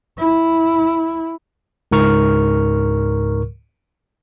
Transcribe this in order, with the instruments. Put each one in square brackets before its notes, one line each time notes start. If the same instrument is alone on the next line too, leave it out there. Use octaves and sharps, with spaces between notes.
[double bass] E4
[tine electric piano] C#2 G#2 A#4 C#6 F6